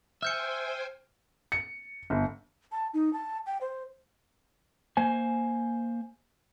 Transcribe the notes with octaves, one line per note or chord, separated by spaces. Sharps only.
C5 E5 G5 G#5 F6 G6 C#7
C#7
G1
A5
D#4
A5
G5
C5
A#3 C5 G#5